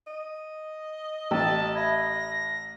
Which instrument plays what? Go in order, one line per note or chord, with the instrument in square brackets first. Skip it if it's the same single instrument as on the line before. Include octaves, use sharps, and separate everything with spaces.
[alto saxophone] D#5
[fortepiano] A1 [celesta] G5 E6 [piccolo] A5
[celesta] E5 B5 G#6 [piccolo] A#6